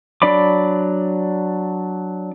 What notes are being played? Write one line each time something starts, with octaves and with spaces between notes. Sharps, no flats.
F#3 D4 D5 B5 D6